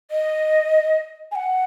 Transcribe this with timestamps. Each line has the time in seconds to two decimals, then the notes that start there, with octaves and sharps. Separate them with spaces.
0.11 D#5
1.32 G#5
1.35 F#5